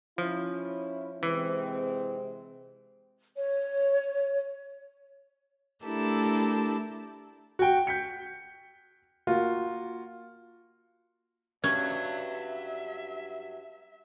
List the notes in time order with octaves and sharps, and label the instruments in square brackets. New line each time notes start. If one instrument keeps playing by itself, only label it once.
[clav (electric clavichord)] F3 [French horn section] C#4 E4
[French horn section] C3 G#3 C4 [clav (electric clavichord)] E3
[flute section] C#5
[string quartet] A3 D4 E4 G4 A4 A#4
[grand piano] F#4 G5
G6 B6 C#7
A#3 F4 F#4
[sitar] G2 F#3 F#4 [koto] C#4 [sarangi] E5 [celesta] G#6